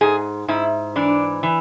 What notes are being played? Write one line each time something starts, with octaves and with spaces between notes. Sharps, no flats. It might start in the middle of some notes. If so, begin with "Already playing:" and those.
G#2 G#4
G#2 E4
E3 D4
E3